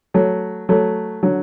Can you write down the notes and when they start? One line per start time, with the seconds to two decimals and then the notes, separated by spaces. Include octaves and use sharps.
0.14 F#3 A3
0.69 F#3 A3
1.23 D3 F#3